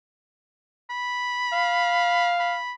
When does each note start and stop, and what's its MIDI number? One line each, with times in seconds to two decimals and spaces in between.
0.90 2.33 83
1.53 2.60 77
2.40 2.72 83